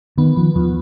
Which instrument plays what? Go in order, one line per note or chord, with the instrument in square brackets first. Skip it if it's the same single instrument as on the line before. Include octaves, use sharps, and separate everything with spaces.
[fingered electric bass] D#3 [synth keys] B3
[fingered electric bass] F3 [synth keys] B3
[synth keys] D#2 [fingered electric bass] F3